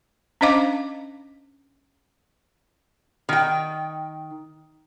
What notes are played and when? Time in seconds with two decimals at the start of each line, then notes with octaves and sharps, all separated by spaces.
0.41 C#4 D4 C5 D#5 F5 D6
3.29 D#3 G5